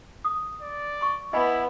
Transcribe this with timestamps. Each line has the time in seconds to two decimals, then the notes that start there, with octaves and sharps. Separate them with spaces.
0.24 D#6
0.61 D5
1.01 C6 C#6
1.33 B3 E4 D#5 G#5 B5